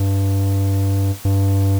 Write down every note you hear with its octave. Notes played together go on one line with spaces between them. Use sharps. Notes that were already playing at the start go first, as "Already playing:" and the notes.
Already playing: G2
G2